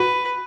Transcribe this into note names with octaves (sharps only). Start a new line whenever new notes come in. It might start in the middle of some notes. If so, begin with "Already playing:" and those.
Already playing: F#4 B4